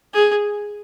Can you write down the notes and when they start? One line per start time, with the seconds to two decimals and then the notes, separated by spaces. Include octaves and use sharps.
0.14 G#4